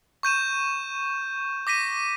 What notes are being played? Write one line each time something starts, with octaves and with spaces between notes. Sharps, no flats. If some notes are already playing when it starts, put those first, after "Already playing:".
C#6 G6 D#7 E7
D6 A#6 B6 D#7